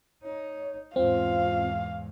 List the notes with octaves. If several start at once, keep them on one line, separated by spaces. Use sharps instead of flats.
D#4 C#5
E2 G#2 C4 F4 F5